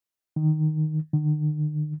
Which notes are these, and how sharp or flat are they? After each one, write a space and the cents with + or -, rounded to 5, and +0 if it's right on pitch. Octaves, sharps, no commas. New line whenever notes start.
D#3 -5
D#3 -45